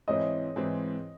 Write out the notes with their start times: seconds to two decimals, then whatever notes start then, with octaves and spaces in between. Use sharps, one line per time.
0.08 G#2 E3 G#3 C4 E4 C#5 D#5
0.56 G#2 E3 G#3 C4 E4